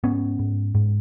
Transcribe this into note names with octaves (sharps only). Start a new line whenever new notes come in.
G#2 B3 C#4
G#2
G#2